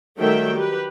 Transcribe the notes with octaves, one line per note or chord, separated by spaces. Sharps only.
D#3 F#3 G3 A3 E5 G5
G4 B4